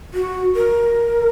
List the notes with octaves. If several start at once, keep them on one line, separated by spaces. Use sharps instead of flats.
F#4
A#4